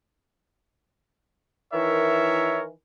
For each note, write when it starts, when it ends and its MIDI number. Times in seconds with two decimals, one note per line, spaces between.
1.72 2.67 51
1.72 2.67 52
1.72 2.61 70
1.72 2.61 73
1.72 2.61 76